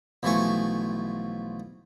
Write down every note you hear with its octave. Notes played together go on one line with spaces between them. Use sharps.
B1 E3 F3 A3 G#5 C#6